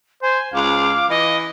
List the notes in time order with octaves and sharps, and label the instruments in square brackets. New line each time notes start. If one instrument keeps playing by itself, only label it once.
[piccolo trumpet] C5 [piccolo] G#5
[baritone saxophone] C#2 [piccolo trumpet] F5 [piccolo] D6
[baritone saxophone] E3 [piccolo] D#5